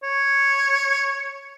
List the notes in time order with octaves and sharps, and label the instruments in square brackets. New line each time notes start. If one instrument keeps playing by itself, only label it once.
[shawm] C#5